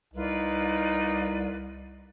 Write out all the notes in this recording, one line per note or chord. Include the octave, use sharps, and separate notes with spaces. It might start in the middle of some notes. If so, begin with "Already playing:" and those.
C2 D#4 F4 B4 D5